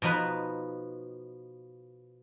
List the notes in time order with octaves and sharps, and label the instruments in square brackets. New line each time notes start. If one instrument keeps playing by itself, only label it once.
[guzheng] B2 F3 D#4 B4